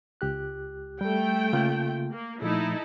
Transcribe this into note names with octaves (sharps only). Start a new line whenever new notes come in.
C#2 G4 F#6
G3 A3 A4 G5
C#3 A#3 F4
A#3
A#2 F3 A3 D#4 E4 A4